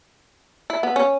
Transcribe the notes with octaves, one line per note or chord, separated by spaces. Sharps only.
E4
B3
C#4